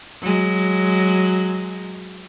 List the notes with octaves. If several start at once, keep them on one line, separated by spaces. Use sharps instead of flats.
F#3 G#3